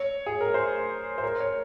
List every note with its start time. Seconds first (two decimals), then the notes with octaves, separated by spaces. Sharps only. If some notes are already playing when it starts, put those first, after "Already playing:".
Already playing: C#5
0.26 G#4
0.41 A#4
0.54 C5
1.18 C5
1.24 A#4
1.40 C#5